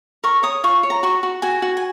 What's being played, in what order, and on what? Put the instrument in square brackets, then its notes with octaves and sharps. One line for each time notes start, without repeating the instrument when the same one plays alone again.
[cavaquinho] A#4 C#6
C#5 D#6
F4 C#6
C#5
A#5
F#4 C#6
F#4
F#4 G#5
F#4
G#5